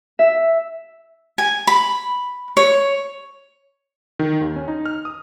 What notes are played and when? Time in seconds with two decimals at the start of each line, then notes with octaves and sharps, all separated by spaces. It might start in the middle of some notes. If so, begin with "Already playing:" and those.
0.19 E5
1.38 G#5
1.67 B5
2.57 C#5
4.19 D#3
4.41 D#2
4.56 C#4
4.68 D#4
4.86 F6
5.05 D#6